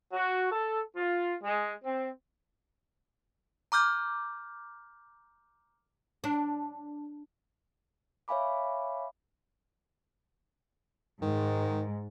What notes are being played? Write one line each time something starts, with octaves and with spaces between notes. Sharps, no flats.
F#4
A4
F4
G#3
C4
A#5 D6 F6 G6
D4
C#5 E5 F5 G#5 B5 D6
G#2 D#3